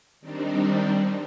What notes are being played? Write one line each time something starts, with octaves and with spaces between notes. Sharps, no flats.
D#3 G3 C4 D4 D#4